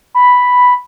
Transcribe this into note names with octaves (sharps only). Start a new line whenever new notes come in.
B5